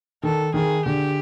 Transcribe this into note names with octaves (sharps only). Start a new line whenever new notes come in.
D#3 A4
D#3 G#4
D3 G4